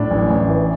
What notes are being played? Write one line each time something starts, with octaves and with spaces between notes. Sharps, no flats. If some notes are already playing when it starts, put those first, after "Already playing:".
Already playing: A2 D4
A1
A1
E3